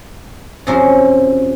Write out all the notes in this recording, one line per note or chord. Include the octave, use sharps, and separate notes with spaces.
F#2 C3 F3 C#4 C5 C6